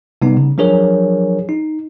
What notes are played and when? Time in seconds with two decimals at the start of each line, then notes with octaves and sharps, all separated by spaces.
0.22 C3 G3 B3 D#4
0.37 C#3
0.58 F3 F#3 D4 G#4 A#4 C#5
1.49 D#4